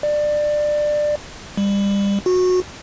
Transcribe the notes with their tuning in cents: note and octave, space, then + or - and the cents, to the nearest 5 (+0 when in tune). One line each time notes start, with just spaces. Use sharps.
D5 +20
G3 +30
F#4 -20